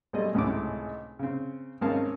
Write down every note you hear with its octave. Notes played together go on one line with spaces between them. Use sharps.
B1 G3 A3 G#4 D#5
G#1 C#2 A2 C3 D6
C#3 C4
G#1 C4 C#4 A#4 F5 A5